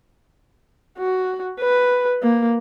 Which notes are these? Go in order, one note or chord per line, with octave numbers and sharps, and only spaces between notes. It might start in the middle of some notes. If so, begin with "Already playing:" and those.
F#4
B4
A#3